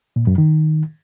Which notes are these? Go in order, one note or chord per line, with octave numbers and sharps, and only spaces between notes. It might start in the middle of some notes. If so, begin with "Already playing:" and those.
A#2
F#2
D#3